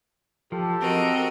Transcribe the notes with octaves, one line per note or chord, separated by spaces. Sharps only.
F3 G4 A4
C4 F#4 A#4 D#5